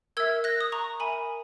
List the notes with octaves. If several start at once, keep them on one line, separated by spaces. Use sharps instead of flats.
A#4 E5 E6 G#6
F#6 A#6
D#6
A#5 C#6
A#4 E5 G#5 B5